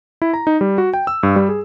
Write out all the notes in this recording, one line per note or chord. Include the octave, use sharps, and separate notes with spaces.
E4
A#5
D#4
G3
F#4
G5
E6
G2
G3
G#4